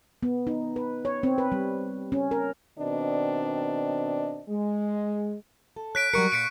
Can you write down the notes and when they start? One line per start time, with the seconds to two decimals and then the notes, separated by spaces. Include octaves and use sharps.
0.23 B3
0.47 D#4
0.76 B4
1.05 C#5
1.23 C4
1.38 B4
1.52 G3
2.12 C#4
2.31 A#4
2.78 B2 D#3 C4 D4 D5 D#5
4.49 G#3
5.76 A4
5.95 C#5 F#6 B6 D7
6.14 F#3 G3 A#4 C#6 C#7
6.32 A#2 B6 C#7 D7